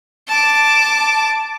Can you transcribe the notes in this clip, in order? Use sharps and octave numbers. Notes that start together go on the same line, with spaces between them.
A5 D6